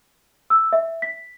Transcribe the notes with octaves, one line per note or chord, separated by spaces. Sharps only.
E6
E5
B6